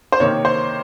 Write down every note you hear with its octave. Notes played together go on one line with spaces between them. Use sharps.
C5
C3 D#3 A#3 C#5
C5